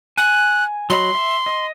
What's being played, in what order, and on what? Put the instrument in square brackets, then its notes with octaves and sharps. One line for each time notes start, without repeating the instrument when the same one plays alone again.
[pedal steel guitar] G#5 [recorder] F#6
[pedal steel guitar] F#3 D#5 B5 [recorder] C6
[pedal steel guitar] E5
D#5